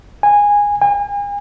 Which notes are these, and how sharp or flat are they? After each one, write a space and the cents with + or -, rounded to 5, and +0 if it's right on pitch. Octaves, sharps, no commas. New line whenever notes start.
G#5 -15
G#5 -40